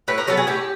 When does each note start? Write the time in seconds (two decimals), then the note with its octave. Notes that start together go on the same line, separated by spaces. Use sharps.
0.08 A2 B4
0.18 A#4
0.27 F#3 B3 A4
0.37 G#4
0.47 A2 G4